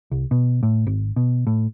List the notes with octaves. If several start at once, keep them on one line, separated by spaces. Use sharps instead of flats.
C2
B2
A2
G#1
B2
A2